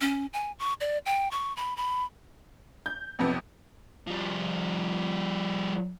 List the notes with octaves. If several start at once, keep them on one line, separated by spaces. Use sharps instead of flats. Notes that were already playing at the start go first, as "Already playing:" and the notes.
C#4
G#5
C#6
D5
G5
C#6
B5
B5
G6
B1 F2 C3 B3
F3 G3